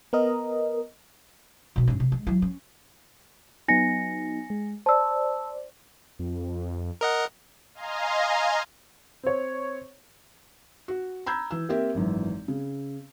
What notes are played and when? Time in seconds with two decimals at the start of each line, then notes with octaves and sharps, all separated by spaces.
0.13 B3 A#4 D#5
1.76 B2 C4
1.88 G2 C#4
2.00 C3
2.12 G#3
2.27 F#3 E4
2.42 C#4
3.68 F#3 B3 D#4 G#5 A#6 C#7
4.50 G#3
4.86 C5 D5 A5 E6
6.19 F2
7.01 A#4 D#5 F#5
7.75 D#5 F5 G#5 A#5 C6
9.23 C4 C#5
10.88 F#4
11.26 A#5 B5 E6 G6 G#6
11.51 E3 E6
11.69 A#3 C4 G4 A#4 E5
11.95 G#1 F#2 E3
12.48 C#3